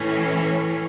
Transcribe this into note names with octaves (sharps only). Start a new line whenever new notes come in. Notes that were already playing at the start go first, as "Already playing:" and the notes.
Already playing: A2 E3 C#4